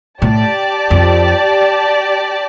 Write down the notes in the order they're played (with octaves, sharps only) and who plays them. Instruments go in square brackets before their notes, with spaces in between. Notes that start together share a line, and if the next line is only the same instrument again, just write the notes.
[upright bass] A2 [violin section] G4 D5 A5
[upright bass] F2